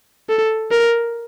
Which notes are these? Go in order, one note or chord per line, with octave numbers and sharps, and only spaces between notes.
A4
A#4